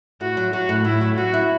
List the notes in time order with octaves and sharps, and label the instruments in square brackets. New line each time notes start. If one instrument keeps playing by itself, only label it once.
[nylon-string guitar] A2 [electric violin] F#4
[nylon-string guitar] F#3
[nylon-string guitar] F#3 [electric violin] F#4
[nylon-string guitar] A2
[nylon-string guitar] A2 [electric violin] E4
[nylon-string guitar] F#3
[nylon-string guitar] F#3 [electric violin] F#4
[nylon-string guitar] E4